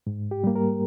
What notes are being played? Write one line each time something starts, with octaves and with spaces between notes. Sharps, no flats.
G#2
G4
G3 A#3
A#4